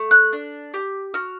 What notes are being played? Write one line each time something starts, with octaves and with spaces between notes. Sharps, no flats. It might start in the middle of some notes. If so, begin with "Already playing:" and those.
Already playing: A3
F#6
D4
G4
F#4 F6